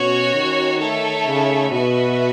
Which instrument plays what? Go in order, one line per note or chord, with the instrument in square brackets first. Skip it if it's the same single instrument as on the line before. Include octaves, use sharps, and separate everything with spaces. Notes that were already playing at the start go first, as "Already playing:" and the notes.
Already playing: [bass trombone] B2 [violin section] C#4 F#4 C#5
[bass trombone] D#3
[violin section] A3 D#4 A4 C#5 E5
[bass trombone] C#3
[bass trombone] B2 [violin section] B3 F#4 B4 E5